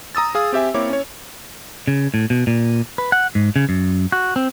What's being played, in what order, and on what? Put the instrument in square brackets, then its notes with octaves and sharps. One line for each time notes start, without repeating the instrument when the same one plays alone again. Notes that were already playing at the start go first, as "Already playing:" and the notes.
[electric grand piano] A#5 D#6 E6 A6
G#4 F5 D#6
C4 G4 E5 G#5
A#3 C4 E4 C#5 D6
C#4 C#5
[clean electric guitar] C#3
A2
B2
A#2
B4
F#5
G#2
C#3
F#2
F#4
C4